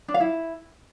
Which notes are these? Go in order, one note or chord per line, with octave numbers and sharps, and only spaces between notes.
D4
F5
E4